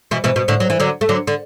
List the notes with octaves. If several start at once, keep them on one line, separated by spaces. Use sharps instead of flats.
B2 E3
B2 E3
B2
A2 D3
F#3
E3
D3 F#3
A3
D3 F#3
D3